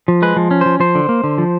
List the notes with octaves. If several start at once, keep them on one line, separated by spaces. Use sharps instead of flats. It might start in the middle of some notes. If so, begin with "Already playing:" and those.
F3
G#3 B4
F3
C#4
F3 C5
F3 C5
D3
A#3
D3
F3